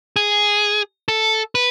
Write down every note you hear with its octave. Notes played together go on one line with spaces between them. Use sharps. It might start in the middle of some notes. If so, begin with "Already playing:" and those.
G#4
A4
B4